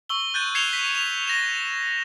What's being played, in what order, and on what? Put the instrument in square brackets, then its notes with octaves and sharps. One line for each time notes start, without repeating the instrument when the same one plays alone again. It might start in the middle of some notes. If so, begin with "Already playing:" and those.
[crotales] C#6 E6 G7
F#6 G6 A6 D#7
G#6 C7 C#7 E7 F7 G7
B6
F7
A#6 E7 F7